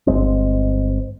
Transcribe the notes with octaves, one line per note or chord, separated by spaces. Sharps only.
G1 F#2 G#3 C4